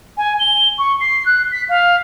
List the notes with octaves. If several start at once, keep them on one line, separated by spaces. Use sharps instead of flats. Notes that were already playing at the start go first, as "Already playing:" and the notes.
G#5
G7
C#6
C7
F#6
B6
F5